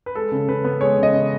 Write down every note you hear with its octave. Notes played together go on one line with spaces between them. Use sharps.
B4
G#3 A4
C#3
C#3 B4
B3
G#3 C#5
C#3 D#5
C#3